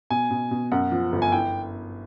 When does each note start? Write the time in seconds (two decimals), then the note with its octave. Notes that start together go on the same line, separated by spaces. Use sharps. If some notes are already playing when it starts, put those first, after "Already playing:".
0.10 B2 G#5
0.31 B2
0.51 B2
0.72 F#2 F#5
0.92 F3
1.12 G1
1.22 G#5
1.32 E4 G5